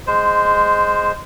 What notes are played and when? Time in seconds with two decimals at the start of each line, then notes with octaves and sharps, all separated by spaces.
0.07 G#3 C5